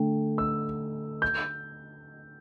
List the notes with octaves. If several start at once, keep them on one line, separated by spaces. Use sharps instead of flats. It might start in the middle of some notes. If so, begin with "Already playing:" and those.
Already playing: D3 A3 D4 G5
E6
G6